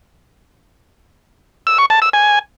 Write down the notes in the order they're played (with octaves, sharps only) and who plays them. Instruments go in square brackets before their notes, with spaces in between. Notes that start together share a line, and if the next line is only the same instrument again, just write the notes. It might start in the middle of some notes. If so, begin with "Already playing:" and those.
[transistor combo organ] E6
C#6
A5
E6
G#5